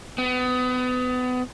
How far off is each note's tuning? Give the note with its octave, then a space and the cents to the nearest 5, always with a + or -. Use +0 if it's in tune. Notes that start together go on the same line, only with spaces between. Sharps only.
B3 +30